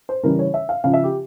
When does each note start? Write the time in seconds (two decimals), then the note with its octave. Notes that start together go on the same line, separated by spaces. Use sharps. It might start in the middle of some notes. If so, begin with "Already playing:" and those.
0.09 C5
0.23 C#3 E3 G3 A#4
0.39 C#5
0.54 E5
0.69 F5
0.84 C#3 F3 F5
0.94 E5
1.04 G4